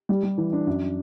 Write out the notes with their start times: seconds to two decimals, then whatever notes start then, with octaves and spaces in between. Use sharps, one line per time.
0.09 G3
0.23 G3
0.38 E3
0.52 D4
0.67 F#2